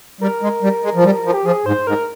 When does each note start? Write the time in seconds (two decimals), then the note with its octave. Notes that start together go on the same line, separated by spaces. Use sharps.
0.21 G3 A#4
0.42 G#3
0.62 G3
0.83 G#3
0.95 F3
1.04 G3
1.25 F3
1.34 G4
1.45 F3 G#4
1.66 G#2 C5
1.87 G#2 A#4